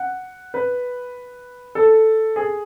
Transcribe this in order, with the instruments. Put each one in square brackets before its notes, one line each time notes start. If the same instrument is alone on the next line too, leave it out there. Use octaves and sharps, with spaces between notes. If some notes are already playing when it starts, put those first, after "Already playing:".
Already playing: [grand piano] F#5
B4
A4
G#4